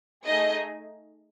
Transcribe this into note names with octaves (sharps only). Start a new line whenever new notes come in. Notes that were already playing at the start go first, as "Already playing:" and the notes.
A3 D#4 G#4 D#5